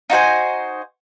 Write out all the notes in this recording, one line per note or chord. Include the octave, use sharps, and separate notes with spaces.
D#4 F#4 C5 G#5